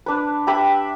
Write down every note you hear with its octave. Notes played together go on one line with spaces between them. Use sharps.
D4 B4
G4 E5 B5